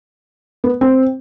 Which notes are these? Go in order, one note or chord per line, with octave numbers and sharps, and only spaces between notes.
B3
C4